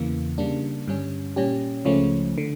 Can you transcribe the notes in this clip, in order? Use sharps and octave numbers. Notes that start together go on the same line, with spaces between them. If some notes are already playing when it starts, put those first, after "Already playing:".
Already playing: E2 C#3 E3 A#3
C#3 G3 A#3 D4
G2 D3 G3 C#4
A#2 G3 C#4 G4
C#2 C#3 F3 A3 C#4
D3